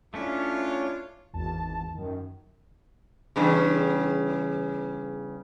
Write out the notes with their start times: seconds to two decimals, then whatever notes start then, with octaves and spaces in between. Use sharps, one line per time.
0.14 A3 C#4 D4 E4 F4 C#5
1.33 G#1 E2 A5
1.94 F#2 D#3
3.36 E2 G2 C#3